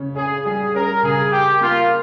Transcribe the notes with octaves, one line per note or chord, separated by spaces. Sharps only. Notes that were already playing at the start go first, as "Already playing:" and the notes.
Already playing: C#3 C#4
C#4 G#4
G3 G#4
C#4 A#4
C#3 G#4
G4 A#4
A#3 F4